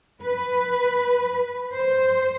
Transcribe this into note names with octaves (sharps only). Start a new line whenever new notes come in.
B4
C5